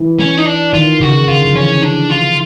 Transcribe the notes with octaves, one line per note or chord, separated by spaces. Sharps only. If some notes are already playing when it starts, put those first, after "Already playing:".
Already playing: E3
C#4
D#4
D4
D#3 F4
C#3 F#4
D3 F4
F3
E3 C#4
D4
F4